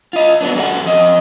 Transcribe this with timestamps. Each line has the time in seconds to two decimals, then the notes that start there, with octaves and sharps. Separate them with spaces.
0.13 F4 D#5
0.41 F#3 B3 D4
0.55 F#2 F#4 G4 A4 F#5
0.84 F2 D#5